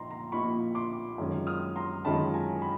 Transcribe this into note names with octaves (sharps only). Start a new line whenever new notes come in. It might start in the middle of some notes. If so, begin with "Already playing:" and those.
Already playing: A#2 F3 A#3 D#4 A#5 C6
A#5 C6
A#2 F3 A#3 D#4 B5 C#6
C6 D6
F#2 D#3 G#3 C#4 F4
D#6 F6
A#5 C6
F#2 D#3 G#3 C#4 F4 A5 B5
G#5 A#5
B5